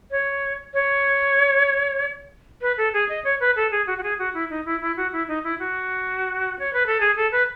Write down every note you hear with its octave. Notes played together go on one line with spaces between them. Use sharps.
C#5
C#5
B4
A4
G#4
D#5
C#5
B4
A4
G#4
F#4
F#4
G#4
F#4
E4
D#4
E4
E4
F#4
E4
D#4
E4
F#4
C#5
B4
A4
G#4
A4
B4